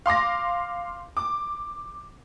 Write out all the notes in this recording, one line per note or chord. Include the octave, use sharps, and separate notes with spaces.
F5 C6 D6 A#6
D6